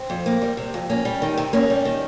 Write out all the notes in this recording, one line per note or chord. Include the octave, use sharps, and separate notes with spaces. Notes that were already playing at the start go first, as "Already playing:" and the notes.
Already playing: C4
F2
A#3
G3
C3
F2
A#3 C#4
G3
D#3
C3
A#3 C#4
G3
D#3